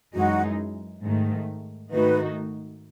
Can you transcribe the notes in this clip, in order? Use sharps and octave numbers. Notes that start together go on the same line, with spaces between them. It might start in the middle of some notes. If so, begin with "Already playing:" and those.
F#2 E3 G#3 D#4 F#4
G#2 D#3 A3
G#2 D#3 A3 D#4 F#4 B4